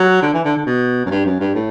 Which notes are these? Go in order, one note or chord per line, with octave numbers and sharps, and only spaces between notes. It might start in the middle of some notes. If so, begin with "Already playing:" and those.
Already playing: F#3
D3
E3
D3
D3
B2
F#2
G2
F#2
G2
A2